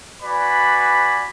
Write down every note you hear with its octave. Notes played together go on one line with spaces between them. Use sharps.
F#4 B4 D5 G#5 B5